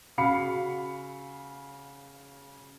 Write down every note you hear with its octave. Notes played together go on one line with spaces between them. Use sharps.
C#3 F#4 F5 B5 C#7